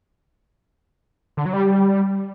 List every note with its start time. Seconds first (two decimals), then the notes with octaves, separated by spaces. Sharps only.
1.37 D3
1.45 F#3
1.53 G3